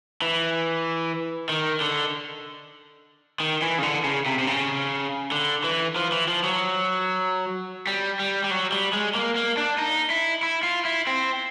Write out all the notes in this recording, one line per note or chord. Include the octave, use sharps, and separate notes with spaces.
E3
D#3
D3
D#3
E3
C#3
D3
C#3
C3
C3
C#3
D3
E3
F3
E3
F3
F#3
G3
G3
G3
F#3
G3
G#3
A#3
A#3
D4
D#4
E4
E4
F4
E4
C4